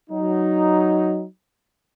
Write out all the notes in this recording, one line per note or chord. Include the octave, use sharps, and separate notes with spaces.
F#3 D#4